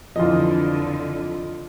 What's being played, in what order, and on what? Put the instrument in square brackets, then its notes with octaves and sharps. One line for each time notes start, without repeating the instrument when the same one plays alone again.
[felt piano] F2 E3 [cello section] D3 [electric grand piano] F4 D#5